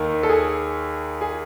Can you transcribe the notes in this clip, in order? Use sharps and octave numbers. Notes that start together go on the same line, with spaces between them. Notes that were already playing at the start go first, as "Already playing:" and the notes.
Already playing: D#2 D#3
A4
G#4
G#4